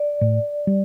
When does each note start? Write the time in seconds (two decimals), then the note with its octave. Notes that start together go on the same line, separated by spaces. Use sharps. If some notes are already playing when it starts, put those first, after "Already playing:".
Already playing: D5
0.21 A2
0.67 G3